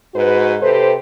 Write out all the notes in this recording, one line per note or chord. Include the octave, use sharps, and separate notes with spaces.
G#2 F#4 B4
C3 G4 A4 B4 C5